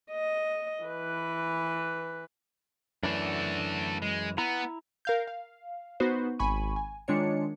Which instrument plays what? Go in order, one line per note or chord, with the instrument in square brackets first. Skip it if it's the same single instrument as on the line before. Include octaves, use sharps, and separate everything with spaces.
[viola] D#5
E3 B4
[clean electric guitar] F#2 E3 [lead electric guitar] A3 D4
[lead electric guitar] G#3
[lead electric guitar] B3 [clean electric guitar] E4 A#5
[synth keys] A#4 F5 G6
F5
B3 D#4 F#4 B4 C5
G#1 G#5 B5 C#6 D#7
G#5
D#3 G#3 D4 F4 C#5 C#7